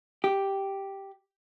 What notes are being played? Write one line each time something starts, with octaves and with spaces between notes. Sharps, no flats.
G4